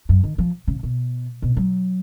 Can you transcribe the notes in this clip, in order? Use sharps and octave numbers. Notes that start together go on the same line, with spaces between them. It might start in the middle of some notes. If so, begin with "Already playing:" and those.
F#2
D#3
F3
C#3
B2
B2
F#3